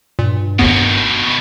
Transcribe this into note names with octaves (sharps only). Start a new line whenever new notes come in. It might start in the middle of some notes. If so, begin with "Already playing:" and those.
G2 A#2
G1 D#2 B2 D#3 B3